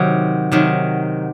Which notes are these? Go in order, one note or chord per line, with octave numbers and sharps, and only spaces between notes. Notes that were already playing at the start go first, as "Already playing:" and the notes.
Already playing: C3 D#3 F#3
C3 D#3 F#3